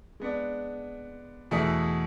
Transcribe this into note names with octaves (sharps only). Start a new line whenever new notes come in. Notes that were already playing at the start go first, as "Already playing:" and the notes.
G#3 B3 D4
E2 B2 A3 E4 G#4